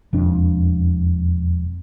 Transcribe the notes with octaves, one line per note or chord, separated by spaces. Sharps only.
E1 F2 D4